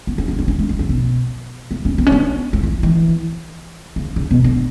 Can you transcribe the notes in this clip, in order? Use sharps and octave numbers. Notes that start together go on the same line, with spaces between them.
B3
C#4
D4
D4
C#4
A3
D3
C#3
B2
A3
C#4
B3
C#4
B3
A3
E3
E3
C#3
C#3
B2
D3